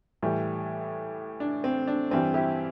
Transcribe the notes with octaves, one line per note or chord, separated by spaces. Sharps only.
A2 E3 G3
D4
C4
D4
G2 E3 G3 C4
E4 G4